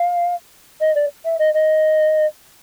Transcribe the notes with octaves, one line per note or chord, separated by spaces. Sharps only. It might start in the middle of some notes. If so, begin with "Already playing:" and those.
Already playing: F5
D#5
D5
E5
D#5
D#5